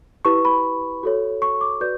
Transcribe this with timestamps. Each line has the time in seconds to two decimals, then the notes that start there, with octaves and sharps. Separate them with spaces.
0.25 E4 G4 B4 C#6
0.45 B5
1.03 F#4 A4 C#5
1.42 C#6
1.61 D6
1.81 F#4 B4 D5 G6